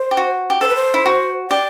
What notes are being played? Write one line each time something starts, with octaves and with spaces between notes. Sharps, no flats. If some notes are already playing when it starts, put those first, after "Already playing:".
Already playing: C5
G4
F#4
G4
A4 C5
B4
C5
E4
F#4
G4 D5